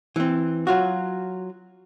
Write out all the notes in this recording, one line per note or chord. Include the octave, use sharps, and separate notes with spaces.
E3 C4
F#3 F4 F#4